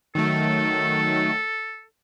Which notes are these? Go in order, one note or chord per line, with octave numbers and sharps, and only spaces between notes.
D#3 F#3 A3 A4